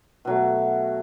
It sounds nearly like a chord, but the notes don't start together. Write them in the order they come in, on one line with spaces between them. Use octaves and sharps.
B2 F#3 A3